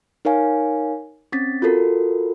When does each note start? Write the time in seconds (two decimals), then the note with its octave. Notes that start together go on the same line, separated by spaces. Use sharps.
0.25 D#4 A#4 C#5 F5 G#5
1.32 C4 C#4 A6 B6
1.62 F4 F#4 A4 A#4